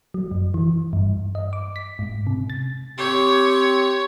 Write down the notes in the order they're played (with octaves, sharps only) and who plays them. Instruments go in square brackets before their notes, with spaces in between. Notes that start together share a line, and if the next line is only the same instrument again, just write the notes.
[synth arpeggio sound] F#3
F#2
E3
G2
D#5
D6
B6
G#2
C3
A6
[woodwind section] C4 G4 [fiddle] C#5